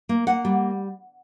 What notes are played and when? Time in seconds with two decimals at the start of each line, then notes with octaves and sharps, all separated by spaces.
0.09 A#3
0.27 A#3 F#5
0.45 G3